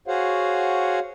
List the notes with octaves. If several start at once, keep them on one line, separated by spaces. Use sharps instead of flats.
F#4 G#4 C5 C#5 F5 F#5